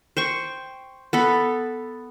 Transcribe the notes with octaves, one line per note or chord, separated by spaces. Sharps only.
C5 G5 C#6
B3 A4 B5